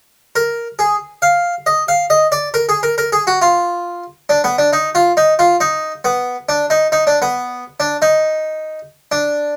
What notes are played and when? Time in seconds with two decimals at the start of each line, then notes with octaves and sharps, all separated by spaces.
0.36 A#4
0.79 G#4
1.22 F5
1.66 D#5
1.88 F5
2.10 D#5
2.32 D5
2.54 A#4
2.69 G#4
2.83 A#4
2.98 A#4
3.13 G#4
3.27 F#4
3.42 F4
4.29 D4
4.44 B3
4.58 D4
4.73 D#4
4.95 F4
5.17 D#4
5.39 F4
5.60 D#4
6.05 B3
6.49 D4
6.70 D#4
6.92 D#4
7.07 D4
7.22 B3
7.80 D4
8.02 D#4
9.12 D4